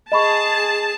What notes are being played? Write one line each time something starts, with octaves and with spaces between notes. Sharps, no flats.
G#4 D#5 A5 B5 C#6